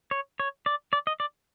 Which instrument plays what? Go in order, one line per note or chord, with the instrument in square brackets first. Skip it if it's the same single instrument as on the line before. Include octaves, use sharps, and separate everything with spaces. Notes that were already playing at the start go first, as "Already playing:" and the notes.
[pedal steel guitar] C#5
C#5
D5
D5
D#5
D5